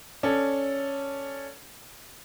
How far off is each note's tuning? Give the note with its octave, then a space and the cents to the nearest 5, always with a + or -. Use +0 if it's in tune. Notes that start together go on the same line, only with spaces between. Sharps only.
C#4 +0 A4 +0 D5 +0